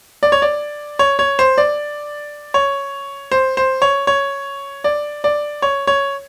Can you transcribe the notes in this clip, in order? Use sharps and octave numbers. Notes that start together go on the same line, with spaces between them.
D5
C#5
D5
C#5
C#5
C5
D5
C#5
C5
C5
C#5
C#5
D5
D5
C#5
C#5